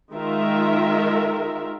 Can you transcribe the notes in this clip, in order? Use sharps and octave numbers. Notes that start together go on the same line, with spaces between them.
D#3 G#3 F4 A#4 E5